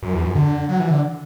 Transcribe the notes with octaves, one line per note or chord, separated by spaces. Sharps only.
F#2
E2
F#2
D3
F#3
E3
D3